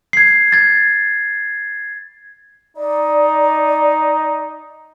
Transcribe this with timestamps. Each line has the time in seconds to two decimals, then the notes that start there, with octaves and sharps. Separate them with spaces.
0.13 G#6 C7
0.52 G#6 A6
2.77 D#4 D5